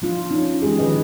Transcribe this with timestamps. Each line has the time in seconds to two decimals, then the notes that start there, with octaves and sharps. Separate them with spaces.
0.02 F3 D4 F4
0.31 C#4 D#4
0.62 E3 G#3 G4 G#4
0.79 D#3 F3 G#4 B4 D#5